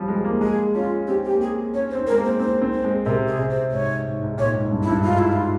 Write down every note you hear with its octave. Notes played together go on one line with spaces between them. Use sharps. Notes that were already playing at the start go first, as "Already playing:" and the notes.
Already playing: F3 G3 C4 C#4
G#3
A#3
G#3 G#4
C#4 F4
C4 G4
G4
A#3
G#4
C#4 C#5
C5
C4
A#4
G#3
A#3
C5
C4 C5
C4
C5
G#3
C3 A#4
G#4
C3
C5
G#2 C#5
G#2
G#2
A#2 C#5
G#2
G2
E4
G2
G#2 F4
E4
F4